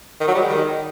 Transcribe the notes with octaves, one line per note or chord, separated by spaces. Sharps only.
D#3
F#3
G3
G#3
D#3